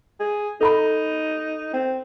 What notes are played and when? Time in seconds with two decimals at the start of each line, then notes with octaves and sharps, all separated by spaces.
0.20 G#4
0.61 D#4 A4 A#5 B5
1.73 C4